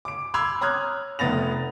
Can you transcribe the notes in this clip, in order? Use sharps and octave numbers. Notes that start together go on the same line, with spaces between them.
D6 D7
B5 C6 D6 E6 G#6 F7
C#5 A#5 D#6 F6 F#6 G#6
F1 A3 B3 A6 A#6 F7